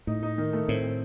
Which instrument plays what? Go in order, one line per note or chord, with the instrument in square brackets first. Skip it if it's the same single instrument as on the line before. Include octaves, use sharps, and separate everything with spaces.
[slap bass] A2 [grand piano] D#4
[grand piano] D#4
D#3
A3
[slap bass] A2 [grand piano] C4
[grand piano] C4